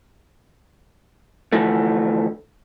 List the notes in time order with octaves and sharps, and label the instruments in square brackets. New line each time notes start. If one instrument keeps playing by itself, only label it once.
[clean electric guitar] D3 E3 F3 A3